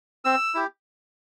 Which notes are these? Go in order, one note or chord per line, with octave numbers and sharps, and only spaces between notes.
C4 E6
E4 G4